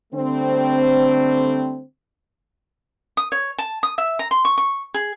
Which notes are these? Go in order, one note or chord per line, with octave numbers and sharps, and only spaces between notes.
D3 G3 A3 C4
D#6
C#5
A5
D#6
E5
A#5
C6
C#6
C#6
G#4